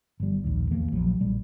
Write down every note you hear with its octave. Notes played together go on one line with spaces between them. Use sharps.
G1 G3
A#1 D#2
E2 E3 A#3
A#1 F3 F#3
A#1 G3